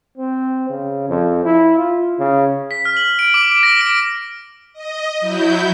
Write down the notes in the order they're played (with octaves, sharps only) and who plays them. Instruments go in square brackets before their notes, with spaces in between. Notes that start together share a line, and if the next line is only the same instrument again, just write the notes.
[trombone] C4
C#3
F2
E4
F4
C#3
[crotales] B6
F6
F#7
D7
D6
D7
A#6
D7
[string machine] D#5
F#3 E4 G6